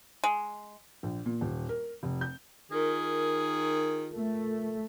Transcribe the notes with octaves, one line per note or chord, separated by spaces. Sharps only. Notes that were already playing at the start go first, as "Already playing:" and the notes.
G#3
A#1
A#2
D#1
A#4
F1
G6
D#3 F4 G#4 A#4
A3